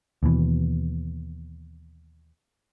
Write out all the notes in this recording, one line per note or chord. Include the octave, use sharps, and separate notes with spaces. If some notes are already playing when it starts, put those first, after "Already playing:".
D#2 B2 E3